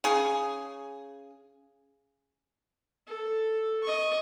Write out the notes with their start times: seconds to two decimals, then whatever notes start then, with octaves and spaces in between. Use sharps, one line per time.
0.04 C#3 G#4
3.07 A4
3.83 D#5 C#6